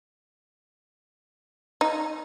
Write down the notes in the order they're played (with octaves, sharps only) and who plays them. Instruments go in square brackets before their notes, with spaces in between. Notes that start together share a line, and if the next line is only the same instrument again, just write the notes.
[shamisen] D#4